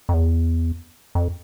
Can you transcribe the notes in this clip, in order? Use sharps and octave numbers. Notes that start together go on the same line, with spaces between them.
F2
E2
F2